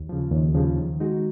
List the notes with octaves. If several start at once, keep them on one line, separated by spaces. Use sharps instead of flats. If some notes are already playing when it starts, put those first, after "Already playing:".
Already playing: D#2
C#3 F3
D#2
C#3 F3
D#3
G#3 D#4 F#4